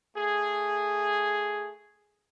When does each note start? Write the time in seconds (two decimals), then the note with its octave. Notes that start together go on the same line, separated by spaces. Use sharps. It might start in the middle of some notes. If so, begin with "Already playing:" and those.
0.15 A3 G#4